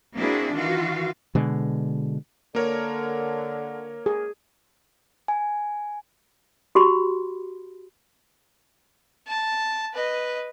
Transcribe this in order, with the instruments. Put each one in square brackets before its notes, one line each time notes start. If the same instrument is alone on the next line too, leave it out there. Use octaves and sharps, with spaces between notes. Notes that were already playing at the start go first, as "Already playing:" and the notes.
[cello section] A#3 C4 D4 E4 F#4 G#4
D#3 E3 F4 F#4 F5
[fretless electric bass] B2 D3 G#3
[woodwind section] D3 [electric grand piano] A#3 A#4 C#5
[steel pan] G#4
[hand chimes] G#5
[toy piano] F#4 G4 B5 C6
[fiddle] A5
B4 D#5